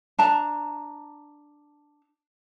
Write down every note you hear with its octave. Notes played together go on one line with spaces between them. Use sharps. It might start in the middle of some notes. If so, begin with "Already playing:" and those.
D4 A5 A#5